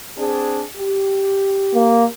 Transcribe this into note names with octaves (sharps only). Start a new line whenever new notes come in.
C4 D4 G#4
G4
A#3